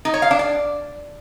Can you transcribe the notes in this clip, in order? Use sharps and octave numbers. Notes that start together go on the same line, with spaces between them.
D#4
C#5
F5
D4
D5